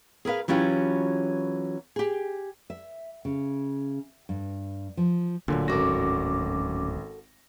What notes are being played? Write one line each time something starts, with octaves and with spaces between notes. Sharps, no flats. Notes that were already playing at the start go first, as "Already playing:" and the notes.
G#4 A#4 B4 F5
E3 F#3 C#4 F4 G4
G4 G#4
E5
C#3
G2
F3
D1 D2 A#2 D3 F#3
G#1 C#4 F#4 A4 A#4 D6 A#6